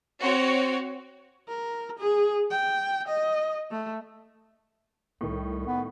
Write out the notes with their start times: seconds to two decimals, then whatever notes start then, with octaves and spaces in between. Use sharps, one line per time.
0.20 C4 F#4 C5 C#5
1.49 A#4
1.99 G#4
2.51 G5
3.08 D#5
3.71 A3
5.21 C2 A2 D#3
5.66 B3